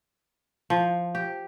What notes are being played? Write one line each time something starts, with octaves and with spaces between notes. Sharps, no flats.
F3
G4